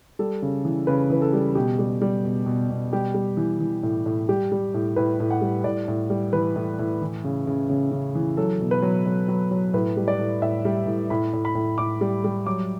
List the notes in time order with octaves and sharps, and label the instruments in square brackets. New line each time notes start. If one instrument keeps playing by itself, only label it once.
[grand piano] G3 A4
C#3
E3
C#3 B4
E3 B4
A4
G3
B2 G4
G3
G3
B2
B2
B2
G3 G4
G3
E3
E3
A2
A2
G3 G4
G3
A2
A2 B4
A2
F#5
G3
A2 D5
A2
G3
E3 B4
A2
A2
E3
C#3
C#3
C#3
C#3
E3
F#3 A4
B2
B4
F#3
F#3
F#3
F#3
A2 B4
G3
D5
A2
A2 E5
G3
A2
A2 B5
A2
B5
A2
A2 D6
G3
G3
F#3 D6